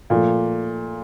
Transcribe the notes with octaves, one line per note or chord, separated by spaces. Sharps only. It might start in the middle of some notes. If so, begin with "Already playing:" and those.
A#2 F3 A3